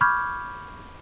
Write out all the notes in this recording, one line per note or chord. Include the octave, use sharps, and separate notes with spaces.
B5 C#6 D6 F6 G6 G#6